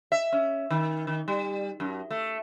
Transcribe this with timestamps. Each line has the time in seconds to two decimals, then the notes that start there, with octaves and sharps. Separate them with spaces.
0.12 E5
0.32 C#4
0.70 D#3
1.07 D#3
1.28 G3
1.80 F#2
2.11 A3